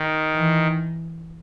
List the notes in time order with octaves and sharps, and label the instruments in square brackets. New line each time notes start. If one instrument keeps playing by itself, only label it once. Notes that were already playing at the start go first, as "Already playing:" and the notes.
Already playing: [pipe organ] D#3
[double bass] E3